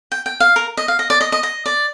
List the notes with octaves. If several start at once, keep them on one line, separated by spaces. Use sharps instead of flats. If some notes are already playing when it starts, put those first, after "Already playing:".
G5
G5
F5
A#4
D#5
F5
D#5
D5
D#5
D#5
D#5
D5